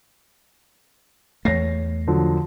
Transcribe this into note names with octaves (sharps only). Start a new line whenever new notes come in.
E2 A3 C#5 A#6 C7
D3 F3 F#3